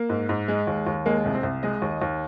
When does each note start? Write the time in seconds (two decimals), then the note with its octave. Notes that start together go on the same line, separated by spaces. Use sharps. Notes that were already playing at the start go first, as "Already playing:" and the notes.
Already playing: A#3
0.09 G#2
0.29 G#2
0.48 G#3
0.67 D#2
0.87 D#2
1.06 G#3 A#3
1.25 C2
1.35 C4
1.43 C2
1.63 G#3 D#5
1.82 D#2
2.02 D#2